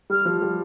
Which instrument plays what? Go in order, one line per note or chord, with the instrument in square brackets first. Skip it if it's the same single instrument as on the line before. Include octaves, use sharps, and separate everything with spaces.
[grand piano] G3 [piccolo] F6
[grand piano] F3
G3